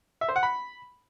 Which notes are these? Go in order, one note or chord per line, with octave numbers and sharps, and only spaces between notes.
E5
C5
F#5
B5